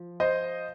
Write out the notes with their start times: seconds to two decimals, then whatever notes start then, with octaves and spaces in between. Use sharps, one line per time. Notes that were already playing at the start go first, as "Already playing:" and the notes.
Already playing: F3
0.20 C5 D#5